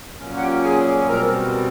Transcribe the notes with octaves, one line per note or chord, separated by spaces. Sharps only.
A#2 F#3 A#3 C#4
F#5
G4 G5
G#4 G#5
B2 G3 C4 A#4 A#5